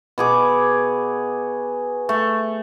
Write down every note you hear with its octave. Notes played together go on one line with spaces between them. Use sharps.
B2 G#4 D6
A3